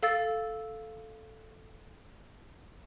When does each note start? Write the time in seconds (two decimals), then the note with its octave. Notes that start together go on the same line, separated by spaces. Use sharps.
0.03 A4 F5 E6 A6